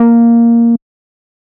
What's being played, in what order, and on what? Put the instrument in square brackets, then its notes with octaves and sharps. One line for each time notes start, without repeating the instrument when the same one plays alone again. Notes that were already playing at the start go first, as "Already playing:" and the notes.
Already playing: [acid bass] A#3